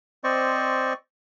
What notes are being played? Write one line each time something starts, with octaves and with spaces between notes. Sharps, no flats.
C4 C5 D5 D#5 C#6